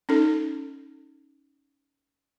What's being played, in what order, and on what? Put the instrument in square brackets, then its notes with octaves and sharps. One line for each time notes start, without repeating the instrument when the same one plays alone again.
[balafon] C#4 D#4 A4